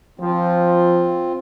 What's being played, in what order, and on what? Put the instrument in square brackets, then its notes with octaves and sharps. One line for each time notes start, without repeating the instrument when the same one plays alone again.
[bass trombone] F3 [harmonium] C4 F4